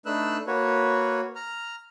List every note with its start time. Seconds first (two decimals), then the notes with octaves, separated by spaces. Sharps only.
0.06 A3 D4 D#4 B4 E6 F#6
0.47 A#3 F#4 B4 C#5
1.36 A#5 F6